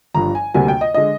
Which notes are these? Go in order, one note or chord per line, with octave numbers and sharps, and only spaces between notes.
G1 G2 F3 A#5
G#5
D2 C3 G3 A#3 G#5
G5
D#5
D3 G#3 D#5